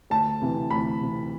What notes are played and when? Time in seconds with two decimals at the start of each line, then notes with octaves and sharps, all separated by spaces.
0.10 D2 A5
0.41 C3 E3
0.71 D2 B5
1.01 C3 E3